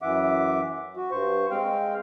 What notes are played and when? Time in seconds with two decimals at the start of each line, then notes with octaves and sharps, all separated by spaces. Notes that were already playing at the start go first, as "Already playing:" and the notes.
0.02 F#2 E3 E5 F#5 D6
0.97 F#4
1.11 G2 C5 C#6
1.51 G#3 C4 F5 G5